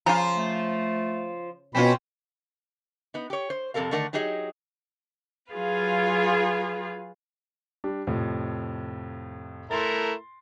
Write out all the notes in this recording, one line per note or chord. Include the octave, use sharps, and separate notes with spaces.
C#3 F3 F4 A#5
A3
B2 C4 C#4 F4 B5
B3 D#4
G4 C#5
C5
F2 C3 A#3 A4 A#4 F5
D3 D#3 A3 A#4 D5 F#5
F#3 D#4 G4 G#4 D#5
F#3 F4 G#4 B4 F5
G3 D4
F2 A2 C3
A3 E4 A#4 C6 A6